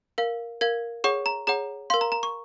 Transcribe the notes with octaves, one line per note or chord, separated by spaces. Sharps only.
A#4 F5
A#4 F5 G#6
G#4 C#5 F#5 C#6
A#5
G#4 C#5 F#5 A#5
A#4 F5 C6
A#5
A#5
C#6